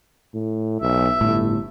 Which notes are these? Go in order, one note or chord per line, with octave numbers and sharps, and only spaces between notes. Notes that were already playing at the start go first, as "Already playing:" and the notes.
A2
B1 E5
G1 A2